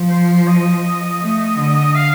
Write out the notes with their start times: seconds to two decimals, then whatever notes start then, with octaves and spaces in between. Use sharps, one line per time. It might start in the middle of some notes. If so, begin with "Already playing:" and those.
Already playing: F3
0.09 C5
0.48 D#5
1.21 A3
1.59 D3
1.95 F5